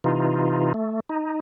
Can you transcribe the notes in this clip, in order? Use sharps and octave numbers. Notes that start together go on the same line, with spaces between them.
C3 E3 D#4 F4
A3
D#4